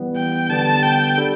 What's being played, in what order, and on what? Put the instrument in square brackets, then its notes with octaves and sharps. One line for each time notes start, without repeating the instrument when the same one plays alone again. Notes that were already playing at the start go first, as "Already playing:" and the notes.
Already playing: [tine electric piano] E3 G3 B3
[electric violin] G5
[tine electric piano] D3 G3 B3 [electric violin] A5
[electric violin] G5
[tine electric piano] G3 D4 A4